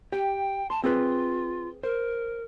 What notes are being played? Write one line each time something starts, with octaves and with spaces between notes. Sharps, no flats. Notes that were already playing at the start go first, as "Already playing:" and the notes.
G4 G5
A5 C6
C4 F4 G#4 B4
A#4 C5